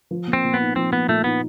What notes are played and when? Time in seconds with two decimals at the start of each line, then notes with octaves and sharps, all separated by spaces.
0.11 F3
0.27 A#3
0.33 C4
0.43 A#2
0.54 B3
0.60 D#4
0.76 F3 C4
0.92 A#3 B3
1.08 A#2 A3
1.24 B3 D#4